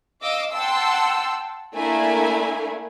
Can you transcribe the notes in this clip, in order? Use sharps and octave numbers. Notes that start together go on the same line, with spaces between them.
D#5 F5 D6 E6
F#5 G5 A5 C6 E6
A3 A#3 D4 E4 A#4 G#5